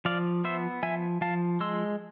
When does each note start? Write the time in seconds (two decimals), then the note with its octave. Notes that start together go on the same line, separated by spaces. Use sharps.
0.05 F3 D5 F5
0.44 B3 C5 E5
0.83 F3 E5 G#5
1.21 F3 F5 A5
1.60 G#3 C6 E6